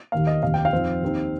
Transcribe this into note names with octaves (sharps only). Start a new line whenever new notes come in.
D#2 D#3 A#3 F5
D#5
F1 D#2 D#3 F5
G5
F5
F2 F3 C4 D#4
D#2 D#3 C4 D#4